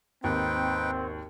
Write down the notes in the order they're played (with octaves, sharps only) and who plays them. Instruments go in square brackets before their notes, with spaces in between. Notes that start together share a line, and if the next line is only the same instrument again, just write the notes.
[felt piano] G#1 D#2 [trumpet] C4 [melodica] D#4 B4 G5